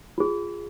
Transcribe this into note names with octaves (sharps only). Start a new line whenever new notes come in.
F4 G#4